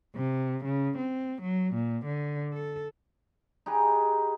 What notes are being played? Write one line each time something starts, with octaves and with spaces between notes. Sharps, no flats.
C3
C#3
C4
F#3
A#2
D3
A4
D#4 G4 G#4 B4